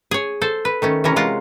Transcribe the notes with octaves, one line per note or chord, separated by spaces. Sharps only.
G#4 C#5
A4 C5
B4
D#3 A3 C#4
C3 E3 C#4 A#4
G#3 F4 F#5